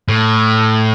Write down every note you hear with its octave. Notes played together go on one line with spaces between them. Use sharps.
A2